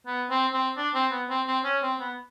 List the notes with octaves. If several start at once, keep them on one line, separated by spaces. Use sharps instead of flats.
B3
C4
C4
D4
C4
B3
C4
C4
C#4
C4
B3